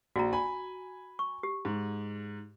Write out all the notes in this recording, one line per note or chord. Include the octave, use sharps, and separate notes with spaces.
A#1 F#4 A#5
G#5 B5
C#6
G4
G#2